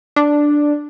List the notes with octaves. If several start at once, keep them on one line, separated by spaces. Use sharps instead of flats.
D4